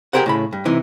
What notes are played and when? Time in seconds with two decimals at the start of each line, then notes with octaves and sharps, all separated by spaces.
0.13 G4 G#4 A#4 C5 F#5
0.26 A2 C#3 B5
0.53 G2
0.65 C3 E3 D#4